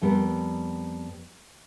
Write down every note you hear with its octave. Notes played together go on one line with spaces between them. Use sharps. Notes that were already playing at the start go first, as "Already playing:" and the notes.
F2 G3 B3 A#4